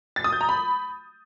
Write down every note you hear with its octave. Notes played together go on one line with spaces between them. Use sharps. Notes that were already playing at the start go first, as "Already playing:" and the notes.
A6
D#6
G6
A#5
B5